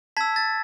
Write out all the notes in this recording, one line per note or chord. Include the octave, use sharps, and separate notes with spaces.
A5 E6 G#6 B6
A6